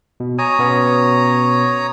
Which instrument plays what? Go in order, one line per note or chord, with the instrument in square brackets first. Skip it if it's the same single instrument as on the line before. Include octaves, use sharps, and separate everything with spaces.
[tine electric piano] B2
[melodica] C#5 A#5 D#6 [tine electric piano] G#5
[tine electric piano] B2 B3 C#4